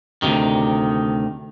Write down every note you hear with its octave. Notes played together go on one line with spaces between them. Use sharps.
D2 G2 C3 D#3